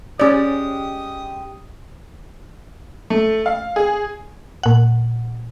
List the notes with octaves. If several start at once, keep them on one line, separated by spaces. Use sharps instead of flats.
G#3 C#4 G4 D5 D#6
A3
F5
G#4
A#2 F#5